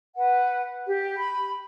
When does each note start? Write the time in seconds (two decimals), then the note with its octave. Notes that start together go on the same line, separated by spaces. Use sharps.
0.17 B4 F#5
0.87 G4
1.17 B5